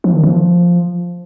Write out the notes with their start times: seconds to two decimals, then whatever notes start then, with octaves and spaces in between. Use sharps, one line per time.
0.04 F3
0.14 D#3
0.23 F3